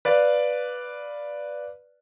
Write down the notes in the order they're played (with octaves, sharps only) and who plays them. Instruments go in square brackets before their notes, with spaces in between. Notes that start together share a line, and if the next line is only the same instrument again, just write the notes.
[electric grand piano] B4 D5 F5